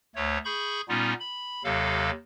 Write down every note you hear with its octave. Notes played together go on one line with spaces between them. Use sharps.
D2 A3 C#5
G#4 B5 C#6 G6
A#2 G3 B3 C#4 D#4 F4
B5
D#2 C3 F#3 A4 F5